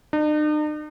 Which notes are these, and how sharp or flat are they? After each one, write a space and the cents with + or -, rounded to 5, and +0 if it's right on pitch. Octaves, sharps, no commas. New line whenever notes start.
D#4 -45